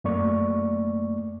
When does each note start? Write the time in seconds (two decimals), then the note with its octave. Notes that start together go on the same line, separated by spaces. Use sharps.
0.04 F#2 A3 A#3 D5 C#6